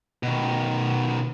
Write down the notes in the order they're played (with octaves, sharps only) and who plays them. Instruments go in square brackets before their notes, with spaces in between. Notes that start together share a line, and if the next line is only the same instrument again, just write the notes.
[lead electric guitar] B2 D#3